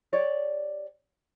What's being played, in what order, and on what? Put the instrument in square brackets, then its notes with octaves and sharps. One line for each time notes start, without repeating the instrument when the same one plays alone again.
[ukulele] G4 C#5 D5